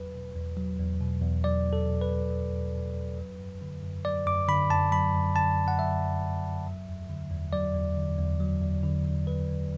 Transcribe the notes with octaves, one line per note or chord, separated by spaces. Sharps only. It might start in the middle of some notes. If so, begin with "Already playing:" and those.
Already playing: E2 F#3 B4
B2
E2
F#3
E2
B2
E2
F#3 D5
E2
A4
B2
B4
E2
F#3
E2
B2
E2
F#3
F#2
D3
F#2
F#3 D5
F#2 D6
D3 B5
F#2 A5
F#3 B5
F#2
D3 A5
F#2
F#5
F#3 E5
F#2
D3
F#2
F#3
E2
D3
E2
F#3 D5
E2
D3
E2
F#3
E2
D3
E2
F#3 B4
E2